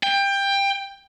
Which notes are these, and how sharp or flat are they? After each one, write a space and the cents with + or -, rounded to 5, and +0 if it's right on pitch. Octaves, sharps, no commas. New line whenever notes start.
G5 +20